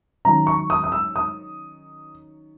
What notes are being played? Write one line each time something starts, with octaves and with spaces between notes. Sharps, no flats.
D#3 F#3 C#4 A#5
C#6
D#6
D#6
E6
D#6